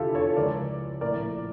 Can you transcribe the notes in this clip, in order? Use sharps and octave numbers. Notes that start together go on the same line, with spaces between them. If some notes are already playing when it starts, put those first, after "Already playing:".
Already playing: F1 E2 D3 E4 F4 G4 A4
A4 C#5
C#2 C#3 F3 A#4 D5
A#1 A2 F3 A#4 D5